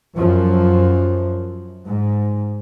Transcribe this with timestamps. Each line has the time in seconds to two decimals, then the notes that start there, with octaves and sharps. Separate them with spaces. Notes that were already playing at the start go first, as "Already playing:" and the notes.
0.17 F#2 F3
1.87 G#2